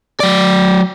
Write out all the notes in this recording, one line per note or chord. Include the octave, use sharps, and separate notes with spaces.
F#3 D5